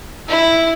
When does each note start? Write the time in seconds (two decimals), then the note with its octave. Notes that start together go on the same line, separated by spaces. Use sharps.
0.28 E4 E5